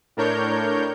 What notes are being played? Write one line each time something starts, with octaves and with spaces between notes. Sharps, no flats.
A2 D4 A#4 C#5 G6